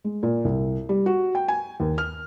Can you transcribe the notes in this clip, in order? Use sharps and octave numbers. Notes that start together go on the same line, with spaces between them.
G#3
A#2
C2
G3
F#4
G5
G#5
D#2
F6